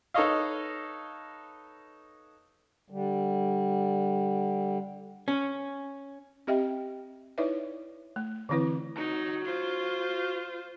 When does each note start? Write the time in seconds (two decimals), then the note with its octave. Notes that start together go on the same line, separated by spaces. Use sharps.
0.14 D#4 A4 B4 C#5 D#5 F5
2.90 D3 G3
5.28 C#4
6.47 C4 G4 D#5 E5 G5
7.38 D#4 E4 B4 C#5 D5 E5
8.16 A3
8.49 D3 E3 C4 E4 B4
8.97 D#4 F#4 A#5
9.45 F4 C5